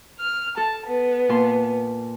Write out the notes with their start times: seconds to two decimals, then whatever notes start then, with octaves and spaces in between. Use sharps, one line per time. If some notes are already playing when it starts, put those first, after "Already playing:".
0.19 F6
0.57 A4 A5
0.87 B3
1.29 A#2 A5 C6